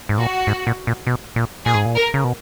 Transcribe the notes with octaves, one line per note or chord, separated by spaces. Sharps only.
G#2
A#2 F#4
G#2
A#2
A#2
B2
A#2
A#2 G#4
G#2
A#2
A#4
C#3
B2